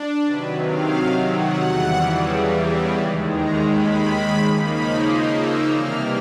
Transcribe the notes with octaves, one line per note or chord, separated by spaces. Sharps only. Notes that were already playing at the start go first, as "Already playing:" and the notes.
Already playing: D4
C3 D#3 F#3 B4
F5
F#5
E2 C#3 E3 G3
D#2 D#3 G#3
A#5
B5
C#3 F3 A#3 D#4
B5
C6
E6
C3 E3 G3 A#3 F6